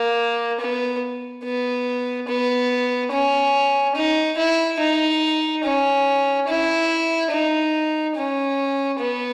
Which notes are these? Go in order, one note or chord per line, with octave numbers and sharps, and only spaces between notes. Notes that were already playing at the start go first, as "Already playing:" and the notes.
Already playing: A#3
B3
B3
B3
C#4
D#4
E4
D#4
C#4
E4
D#4
C#4
B3